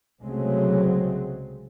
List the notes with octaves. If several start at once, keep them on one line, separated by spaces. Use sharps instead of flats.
C2 C#3 F#3 G#3 A3 C4